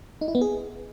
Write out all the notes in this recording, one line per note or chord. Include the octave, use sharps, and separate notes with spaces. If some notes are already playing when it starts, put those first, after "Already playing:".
D#4
E4
B3
G#4